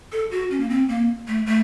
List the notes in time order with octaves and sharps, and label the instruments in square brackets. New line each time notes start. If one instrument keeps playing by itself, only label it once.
[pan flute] A4
F#4
C#4
A#3
C4
A#3
A3
A3